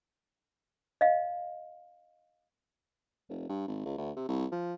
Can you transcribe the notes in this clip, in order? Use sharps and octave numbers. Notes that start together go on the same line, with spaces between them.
D#5 F5
F1
G2
G#1
C#2
D2
C3
C2
F3